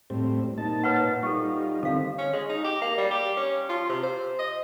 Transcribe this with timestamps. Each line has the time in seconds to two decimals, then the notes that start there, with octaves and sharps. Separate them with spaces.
0.10 A2 G3 C4
0.58 A#2 D#4 A5
0.84 B4 C#5 F#5
1.23 G3 D#4 F4 G4 A4
1.83 D3 D#3 C4 A4 F5
2.18 C#4
2.33 G#3
2.49 D#4
2.64 G4
2.82 A#3
2.98 G3
3.11 G4
3.37 C#4
3.69 F4
3.89 C3
4.03 C5
4.39 D#5